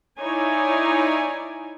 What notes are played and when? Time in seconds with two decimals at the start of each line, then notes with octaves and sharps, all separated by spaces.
0.18 D#4 E4 C#5 D5 G#5